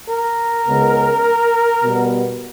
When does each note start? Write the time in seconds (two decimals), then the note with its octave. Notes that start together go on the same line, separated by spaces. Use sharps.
0.09 A#4
0.67 C#2 C#3 G#3 B3
1.84 B2 G3 B3